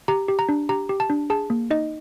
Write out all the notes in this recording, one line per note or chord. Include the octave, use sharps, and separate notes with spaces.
G4 A#5
G4
A#5
D4
G4 A#5
G4
A5
D4
G#4 A5
A#3
D#4 D#5